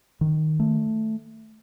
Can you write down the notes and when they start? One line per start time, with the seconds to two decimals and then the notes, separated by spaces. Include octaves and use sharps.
0.21 D#3
0.60 A3